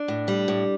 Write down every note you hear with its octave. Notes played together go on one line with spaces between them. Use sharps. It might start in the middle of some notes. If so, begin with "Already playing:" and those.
Already playing: D4
A2
G3
A2